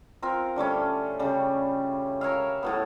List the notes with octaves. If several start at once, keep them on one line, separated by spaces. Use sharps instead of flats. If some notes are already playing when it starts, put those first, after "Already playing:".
C4 F4 A#4
D3 G3 A3 C#4
C#3 G3
A#4 C#5 E5 F5
A2 F#3 B3